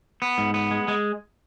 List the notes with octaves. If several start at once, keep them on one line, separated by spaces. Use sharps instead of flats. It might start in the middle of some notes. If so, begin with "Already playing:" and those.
B3
G#2
B3
G#3
G#3